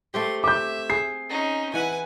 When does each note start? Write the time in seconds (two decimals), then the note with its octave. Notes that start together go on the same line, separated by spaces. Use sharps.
0.14 A3 C4 G4 C6
0.44 E5 D6 G6
0.90 G#4 C7
1.29 C#4 D#4
1.74 E3 B4 F#5 G#5